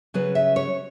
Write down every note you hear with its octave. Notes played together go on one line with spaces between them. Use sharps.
C#3 F#3 C#4 B4
E5
C#5